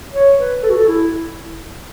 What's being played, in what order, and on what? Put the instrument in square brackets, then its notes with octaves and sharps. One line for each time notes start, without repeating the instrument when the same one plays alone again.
[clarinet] C#5
B4
A4
F#4
A4
E4